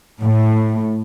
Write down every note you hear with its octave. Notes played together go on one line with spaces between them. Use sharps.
A2